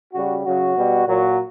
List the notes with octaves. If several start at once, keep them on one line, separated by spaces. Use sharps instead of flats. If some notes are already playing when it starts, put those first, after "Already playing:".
C#3 G3 F#4
C#3 F#3 F#4
B2 G3
A#2 F#3